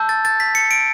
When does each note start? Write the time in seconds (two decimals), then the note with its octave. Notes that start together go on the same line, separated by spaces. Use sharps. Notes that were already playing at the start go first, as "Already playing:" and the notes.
Already playing: A5 E6 G6
0.09 A6
0.25 A6
0.40 B6
0.55 C#7
0.71 D7